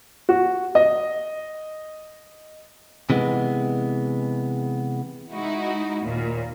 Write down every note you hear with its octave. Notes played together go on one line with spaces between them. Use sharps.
F#4
D#5
C3 E3 G#3 B3
G#3 D#4 E4 F#4
D#2 A#2